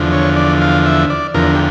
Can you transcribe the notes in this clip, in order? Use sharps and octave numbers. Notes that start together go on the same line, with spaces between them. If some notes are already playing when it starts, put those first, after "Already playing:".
Already playing: E2 D3 F3
C#5
D5
F5
E5
D5
E2 D3 F3 A#4
G4